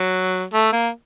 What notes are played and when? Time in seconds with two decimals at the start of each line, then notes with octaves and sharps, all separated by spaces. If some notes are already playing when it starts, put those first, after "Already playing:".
Already playing: F#3
0.53 A3
0.72 A#3